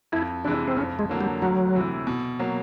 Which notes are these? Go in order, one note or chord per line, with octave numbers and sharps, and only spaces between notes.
F2 E4
C3 E3 G#3 D4
C4
F2 C#4
G#3
D3 F#3 A#3
G3
D2 F#3
C3 E3
B2
F#3 A#3